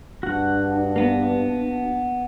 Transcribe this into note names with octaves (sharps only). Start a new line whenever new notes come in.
G2 D4 F#4 F#5
A#3 B3